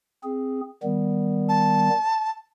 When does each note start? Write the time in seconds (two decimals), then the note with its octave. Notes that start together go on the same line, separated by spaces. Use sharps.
0.23 C4 G#4
0.83 D#3 G3 B3
1.49 A5